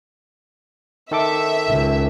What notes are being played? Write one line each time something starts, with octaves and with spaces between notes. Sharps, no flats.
D#3 A4 E5 D6
C#2